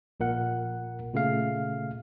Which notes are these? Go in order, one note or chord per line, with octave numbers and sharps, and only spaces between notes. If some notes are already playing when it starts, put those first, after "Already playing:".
A#1 A#2 A#4 F#5
A#2 C#3 A3 F5